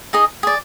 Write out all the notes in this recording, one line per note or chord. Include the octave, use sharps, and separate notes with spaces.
D#4 G#4 D#5
G#4 D5